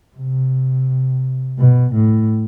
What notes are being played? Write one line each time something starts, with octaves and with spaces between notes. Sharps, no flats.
C3
B2
A2